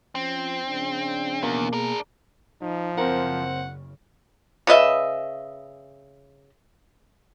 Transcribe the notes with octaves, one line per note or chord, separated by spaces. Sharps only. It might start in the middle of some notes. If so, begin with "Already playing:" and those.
F3 C4 C#4
C#3 F3 D4
E2 B2 A#3
D4 G#4 A#4
F3 D#4
F#1 C#3 C4 A#4 F#5
C#3 B4 D#5 E5